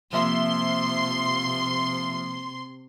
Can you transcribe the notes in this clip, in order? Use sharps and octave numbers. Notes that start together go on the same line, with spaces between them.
C3 F3 A#3 E5 C6